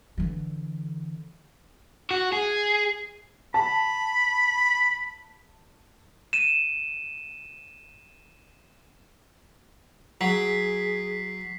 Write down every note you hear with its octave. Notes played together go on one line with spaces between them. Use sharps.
D3 E3
F#4
G#4
A5 B5
D#7 E7
F#3 G#4 B6 C7